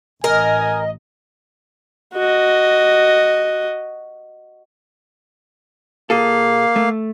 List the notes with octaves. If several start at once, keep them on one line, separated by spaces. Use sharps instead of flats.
A1 A#4 D#5 G#5
F#4 D#5
A#2 A#3 G#4 A4 F5
A3